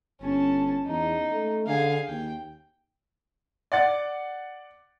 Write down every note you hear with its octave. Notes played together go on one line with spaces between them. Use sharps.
G1 C#4 A5
E2 D#4
A3
D3 G#4 F5
D#2 G5
D5 F#5 A6